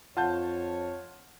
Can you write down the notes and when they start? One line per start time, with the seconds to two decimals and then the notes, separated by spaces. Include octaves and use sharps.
0.17 F2 F4 C#5 F#5 A5 G6